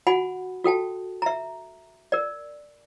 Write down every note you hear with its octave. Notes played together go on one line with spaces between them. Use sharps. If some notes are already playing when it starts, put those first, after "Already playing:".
F#4 F#5 G#5 B5
F#4 A4 G5 A5
E5 A#5
A#4 D5